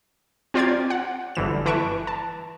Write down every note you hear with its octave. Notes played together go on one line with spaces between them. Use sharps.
C4 F4 C5 D5 A#5 G#6
F#5
G1 D3 E3 E7
E3 B4 A5 C#6 D7 E7
A5